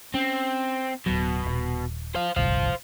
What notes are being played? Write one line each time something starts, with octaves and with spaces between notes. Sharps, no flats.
C4 C#4
D1 B2 F#3
D#1
C5 F5
D1 G1 C2 C5 F5